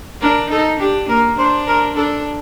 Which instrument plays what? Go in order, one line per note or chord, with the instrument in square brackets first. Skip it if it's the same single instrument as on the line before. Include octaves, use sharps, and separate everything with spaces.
[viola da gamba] D4 [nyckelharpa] A#4
[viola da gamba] D#4 [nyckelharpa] A4
[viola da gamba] D4 [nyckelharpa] G4
[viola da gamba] A#3 [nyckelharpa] A#4
[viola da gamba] D4 [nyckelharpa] C5
[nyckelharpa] A#4
[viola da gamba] D4 [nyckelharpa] A4